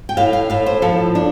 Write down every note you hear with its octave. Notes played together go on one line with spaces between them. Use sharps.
G5
A2 F5
F5
A2 F5
C5
F3 A4
D4